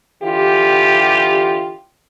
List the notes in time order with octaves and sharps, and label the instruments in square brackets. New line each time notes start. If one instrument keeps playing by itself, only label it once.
[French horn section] D3 E3 F4 G4